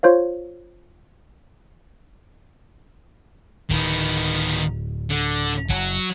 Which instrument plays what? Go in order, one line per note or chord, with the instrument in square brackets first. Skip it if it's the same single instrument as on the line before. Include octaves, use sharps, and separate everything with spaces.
[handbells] F4 C5 C#5 F5
[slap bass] D1 [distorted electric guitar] D#3 B3
[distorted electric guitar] D3
[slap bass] F#1 [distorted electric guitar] F#3